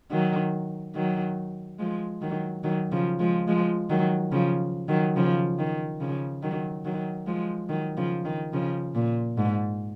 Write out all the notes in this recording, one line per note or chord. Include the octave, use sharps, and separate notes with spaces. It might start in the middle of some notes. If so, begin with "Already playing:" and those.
D#3 F#3
D#3 F#3
F3 G#3
D#3 F#3
D#3 F#3
C#3 F3
F3 G#3
F3 G#3
D#3 F#3
C#3 F3
D#3 F#3
C#3 F3
D#3
C#3 F3
D#3 F#3
D#3 F#3
F3 G#3
D#3 F#3
C#3 F3
D#3
C#3 F3
A#2
G#2